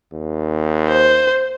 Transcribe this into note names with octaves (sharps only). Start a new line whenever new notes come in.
D#2
C5